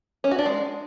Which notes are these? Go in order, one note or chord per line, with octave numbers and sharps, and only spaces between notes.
C#4
F#4
D4
G#3